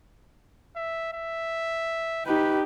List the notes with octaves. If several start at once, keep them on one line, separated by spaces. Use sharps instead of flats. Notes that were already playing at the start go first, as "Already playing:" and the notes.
E5
E5
D#4 G4 B4